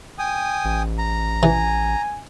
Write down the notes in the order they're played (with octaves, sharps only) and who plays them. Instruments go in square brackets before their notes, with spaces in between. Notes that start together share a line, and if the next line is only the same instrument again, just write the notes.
[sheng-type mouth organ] G5 G#5 D#6
[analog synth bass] A1
[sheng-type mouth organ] A#5
[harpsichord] E3 [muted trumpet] G#5